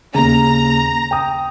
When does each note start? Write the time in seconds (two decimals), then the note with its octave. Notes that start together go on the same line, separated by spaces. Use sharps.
0.14 D#2 C#3 A#5
1.11 G5 D#6